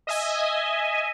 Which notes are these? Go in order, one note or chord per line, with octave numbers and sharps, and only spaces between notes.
D#5 E5 G#5